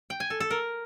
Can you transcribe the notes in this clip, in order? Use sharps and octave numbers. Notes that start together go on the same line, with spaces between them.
G5
G#5
A4
A4
A#4